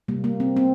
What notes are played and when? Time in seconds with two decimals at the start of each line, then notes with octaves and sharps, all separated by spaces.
0.08 C3 G3 A#3
0.24 A#3
0.40 C4
0.56 C4